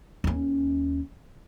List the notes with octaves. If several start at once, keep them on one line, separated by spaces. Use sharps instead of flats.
D#2 C#4